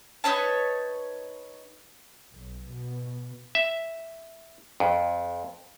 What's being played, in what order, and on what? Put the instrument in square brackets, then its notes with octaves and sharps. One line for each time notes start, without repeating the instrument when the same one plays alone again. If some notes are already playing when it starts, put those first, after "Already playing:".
[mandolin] D#4 B4 C#5 A5
[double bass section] B1
B2
[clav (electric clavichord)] E5
F2